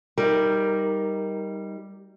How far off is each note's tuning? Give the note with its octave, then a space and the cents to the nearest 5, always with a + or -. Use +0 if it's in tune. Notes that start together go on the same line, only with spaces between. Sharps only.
G3 +0 D#4 +15 A#4 +0